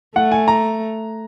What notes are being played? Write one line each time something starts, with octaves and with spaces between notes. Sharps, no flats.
A3 F#5
G#5
A#5